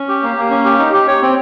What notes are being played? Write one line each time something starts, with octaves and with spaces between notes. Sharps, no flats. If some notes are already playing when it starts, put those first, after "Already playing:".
Already playing: C#4
G4
A#3
A#3
C#4
G4
D#4
G4
C#5
C4